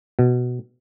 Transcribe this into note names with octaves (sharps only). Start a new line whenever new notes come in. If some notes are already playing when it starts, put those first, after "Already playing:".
B2